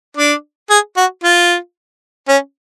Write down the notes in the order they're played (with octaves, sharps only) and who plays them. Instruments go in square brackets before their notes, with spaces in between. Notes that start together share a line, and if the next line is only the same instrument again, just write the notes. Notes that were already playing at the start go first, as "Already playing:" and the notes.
[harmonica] D4
G#4
F#4
F4
C#4